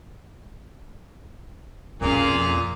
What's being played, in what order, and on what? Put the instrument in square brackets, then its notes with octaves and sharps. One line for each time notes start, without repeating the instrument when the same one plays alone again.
[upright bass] B1 C#4 [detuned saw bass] F2 [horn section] A#2 [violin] G#4 F5